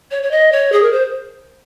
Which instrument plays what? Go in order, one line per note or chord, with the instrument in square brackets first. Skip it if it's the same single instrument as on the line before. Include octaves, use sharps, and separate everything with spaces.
[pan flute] C#5
C#5
D#5
C#5
G#4
A#4
C5